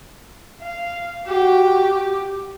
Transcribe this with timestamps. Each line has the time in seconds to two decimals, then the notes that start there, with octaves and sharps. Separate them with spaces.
0.61 F5
1.26 F#4 G4